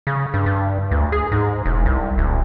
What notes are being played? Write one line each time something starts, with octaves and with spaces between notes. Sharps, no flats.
C#3
G2
G2
D2
G#4
G#2
E1
C2
D1